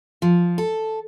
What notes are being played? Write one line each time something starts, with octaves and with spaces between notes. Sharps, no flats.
F3
A4